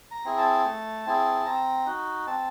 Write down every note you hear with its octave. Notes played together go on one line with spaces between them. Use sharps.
A#5
C4 E4 G#4
A5
A3
C4 E4 G#4
C4 A#5
D#4 F#4
C4 A5